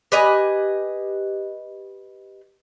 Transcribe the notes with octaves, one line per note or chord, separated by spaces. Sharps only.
G4 B4 D#5 G#5